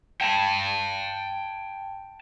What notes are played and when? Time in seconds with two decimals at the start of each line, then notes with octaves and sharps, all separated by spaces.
0.21 G5 A5